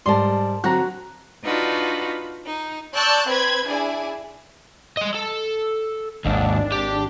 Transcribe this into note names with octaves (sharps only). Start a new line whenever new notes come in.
G#2 G3 A#4 D5 A5 C6
D3 F#3 C4 F#4 A#5 F#6 A#6
D4 D#4 F4 F#4 B4
D#4
D5 A5 C#6 E6 F#6 G6
C4 B4 C5 B5 G#6
D4 E4 G#4 D5 G#5
D#5 C6
A4
G#1 D#2 G#2 D4
G4